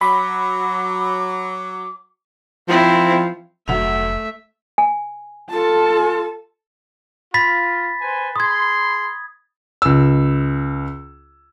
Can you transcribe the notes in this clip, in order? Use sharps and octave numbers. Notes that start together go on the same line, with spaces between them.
F#3 B5 D6
F3 C4 E4
F1 D2 F#3 A3 E5 F7
G#5
F4 A4 A5
F4 B5 A6 B6
B4 C5 G#5
G#4 B5 C6 D#6 G#6
C#2 E6